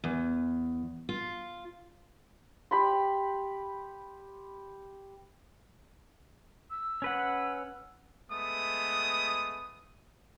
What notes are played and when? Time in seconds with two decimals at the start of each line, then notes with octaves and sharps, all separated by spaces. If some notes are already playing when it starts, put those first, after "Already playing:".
0.04 E2
1.09 F4
2.71 G4 B5 C6
6.70 E6
7.02 C#4 B4 F#5
8.30 G#3 A3 B3 D#6